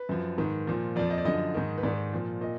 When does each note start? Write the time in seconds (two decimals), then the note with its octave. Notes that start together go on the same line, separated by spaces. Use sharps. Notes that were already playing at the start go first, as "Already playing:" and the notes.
Already playing: B4
0.09 F#2 F3
0.38 G#2 D#3
0.67 A#2 F3
0.96 F2 F3 D5
1.10 D#5
1.18 D5
1.25 F#2 D3 F3 D#5
1.55 G#2 D#3
1.78 B4
1.83 G#2 D#3 D5
2.13 A#2 F3
2.41 A#2 D#5